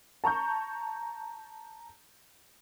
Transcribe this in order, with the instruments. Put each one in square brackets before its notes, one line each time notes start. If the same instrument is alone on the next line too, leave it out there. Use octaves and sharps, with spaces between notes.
[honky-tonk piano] A5 A#5 C#6 G6